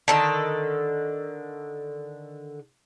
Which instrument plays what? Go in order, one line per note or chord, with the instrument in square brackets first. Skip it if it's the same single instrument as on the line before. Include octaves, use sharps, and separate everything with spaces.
[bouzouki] D3 D#3 A4 [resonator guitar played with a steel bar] A5